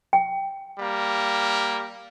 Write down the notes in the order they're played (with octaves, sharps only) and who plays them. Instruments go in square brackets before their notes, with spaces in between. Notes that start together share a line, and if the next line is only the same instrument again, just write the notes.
[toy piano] G5
[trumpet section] G3 A#3